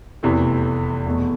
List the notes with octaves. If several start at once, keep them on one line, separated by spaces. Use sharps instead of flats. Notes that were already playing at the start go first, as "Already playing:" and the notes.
F1 E2 C3 E3 A3
F1 E2 B2 A3